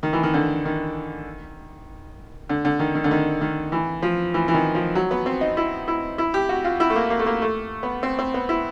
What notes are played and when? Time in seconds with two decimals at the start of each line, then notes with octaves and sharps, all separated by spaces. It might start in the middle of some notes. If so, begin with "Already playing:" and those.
0.03 D#3
0.13 E3
0.23 D#3
0.34 D3
0.65 D#3
2.49 D3
2.65 D3
2.79 D#3
2.95 D#3
3.04 D3
3.11 D#3
3.41 D#3
3.72 E3
4.02 F3
4.34 E3
4.48 E3
4.54 D#3
4.75 F3
4.95 F#3
5.11 B3
5.26 C4
5.41 D#4
5.57 E4
5.88 E4
6.18 E4
6.34 G4
6.49 F#4
6.64 F4
6.80 E4
6.90 A3
6.96 A#3
7.10 A#3
7.19 A3
7.26 A#3
7.42 A3
7.83 B3
8.03 C4
8.19 C4
8.34 B3
8.49 E4